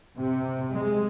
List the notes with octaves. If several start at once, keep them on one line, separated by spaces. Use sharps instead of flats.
C3
G#3